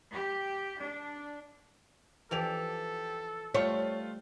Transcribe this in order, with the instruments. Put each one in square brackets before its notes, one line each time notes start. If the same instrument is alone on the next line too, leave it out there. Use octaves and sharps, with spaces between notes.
[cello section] G4
D4
[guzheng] E3 F3 D5 [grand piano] G4 F7 [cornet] A4
[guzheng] G3 [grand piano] A3 F4 [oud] C#5